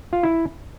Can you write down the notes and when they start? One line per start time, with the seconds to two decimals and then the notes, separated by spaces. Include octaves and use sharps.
0.13 F4
0.23 E4